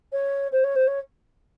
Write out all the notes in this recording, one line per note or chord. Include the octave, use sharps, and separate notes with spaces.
C#5
C5
C#5
C5
C#5